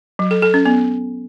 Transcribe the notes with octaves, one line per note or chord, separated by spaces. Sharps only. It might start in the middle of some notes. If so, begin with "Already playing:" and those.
F#3
A4
A4
C#4
B3